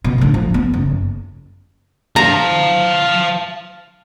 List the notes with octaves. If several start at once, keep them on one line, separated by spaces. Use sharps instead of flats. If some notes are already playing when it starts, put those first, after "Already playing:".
B2
A2 D3
F3
B3
F#1
F5 A5 A#5